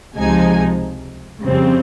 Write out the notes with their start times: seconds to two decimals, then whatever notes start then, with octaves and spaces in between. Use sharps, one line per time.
0.16 C#2 C3 F3 G#3 D#4 G#5
1.43 F2 C#3 G3 C4